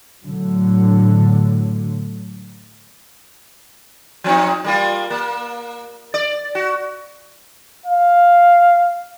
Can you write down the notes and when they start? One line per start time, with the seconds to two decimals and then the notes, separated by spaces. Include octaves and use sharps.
0.24 A2 D3 F#3
4.24 F3 C4 D#4
4.64 G3 A#3 F4
5.10 A#3
6.14 D5
6.55 F#4
7.86 F5